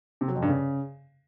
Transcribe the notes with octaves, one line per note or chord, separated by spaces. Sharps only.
C3
F#3
F2
G2
C#3